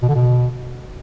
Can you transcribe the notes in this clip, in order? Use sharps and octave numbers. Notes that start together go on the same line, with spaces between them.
B2
D3
B2